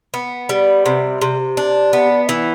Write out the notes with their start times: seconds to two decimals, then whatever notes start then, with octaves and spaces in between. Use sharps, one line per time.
0.14 B3
0.49 G3
0.86 C3
1.21 C3
1.57 D4
1.93 B3
2.29 E3